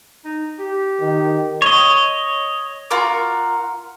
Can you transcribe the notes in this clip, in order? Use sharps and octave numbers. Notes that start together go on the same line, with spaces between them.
D#4
G4
D#3
C#5 D#5
F4 F#4 A#4 D6